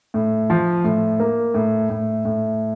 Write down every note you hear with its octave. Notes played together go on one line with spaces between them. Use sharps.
A2
F3
A2
A#3
A2
A2
A2